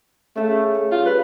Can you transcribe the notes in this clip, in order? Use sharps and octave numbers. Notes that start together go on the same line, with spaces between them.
C#3 A3 A4 A5
A4
G3 F4
B4